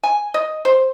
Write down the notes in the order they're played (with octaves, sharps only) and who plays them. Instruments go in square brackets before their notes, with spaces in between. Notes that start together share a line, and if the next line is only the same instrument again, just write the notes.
[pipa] G#5
D#5
C5